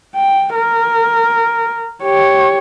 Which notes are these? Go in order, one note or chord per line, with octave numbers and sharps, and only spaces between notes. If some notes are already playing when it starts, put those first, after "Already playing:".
G5
A#4
G4 C#5